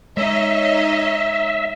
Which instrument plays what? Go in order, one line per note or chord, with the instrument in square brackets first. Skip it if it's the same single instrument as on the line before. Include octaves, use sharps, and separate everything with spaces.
[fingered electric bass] G#3 [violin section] D#4 C#5 D#5 [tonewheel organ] E5